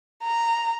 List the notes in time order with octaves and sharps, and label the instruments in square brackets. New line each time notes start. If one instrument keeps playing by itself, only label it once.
[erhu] A#5